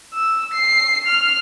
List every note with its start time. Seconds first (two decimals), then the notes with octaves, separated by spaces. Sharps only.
0.14 E6
0.54 C7
1.07 F6